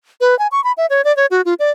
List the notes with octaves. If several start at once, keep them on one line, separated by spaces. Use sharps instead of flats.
B4
G#5
C#6
B5
E5
C#5
D5
C#5
F#4
F4
D5